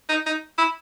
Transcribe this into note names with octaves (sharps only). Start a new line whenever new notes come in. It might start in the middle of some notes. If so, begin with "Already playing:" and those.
D#4
D#4
E4